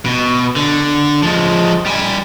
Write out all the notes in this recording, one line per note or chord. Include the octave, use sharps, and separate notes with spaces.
B2
D3
F3 G#3
G3 G#5